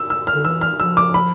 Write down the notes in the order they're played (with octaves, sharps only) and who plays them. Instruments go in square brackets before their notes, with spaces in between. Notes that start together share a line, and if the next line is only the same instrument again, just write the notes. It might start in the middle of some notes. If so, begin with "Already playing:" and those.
Already playing: [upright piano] E6
E6
F6
[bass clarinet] D3
[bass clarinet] E3 [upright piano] E6
[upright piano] F6
[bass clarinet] F3 [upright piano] E6
[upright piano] D6
B5